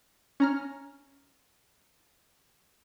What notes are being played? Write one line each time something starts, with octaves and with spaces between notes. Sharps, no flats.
C#4 A#5 F6